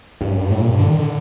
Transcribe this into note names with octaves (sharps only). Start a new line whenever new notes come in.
G2
F#2
G2
A2
A#2
G2
D3
D#3
D3